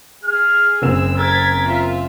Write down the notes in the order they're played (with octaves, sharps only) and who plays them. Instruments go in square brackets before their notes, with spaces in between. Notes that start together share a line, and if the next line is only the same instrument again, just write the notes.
[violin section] G#4 [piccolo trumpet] F6
[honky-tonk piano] F#1 C4 E7 [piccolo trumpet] E6
[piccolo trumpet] A#4 [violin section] G#6 A6 B6
[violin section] F4 E5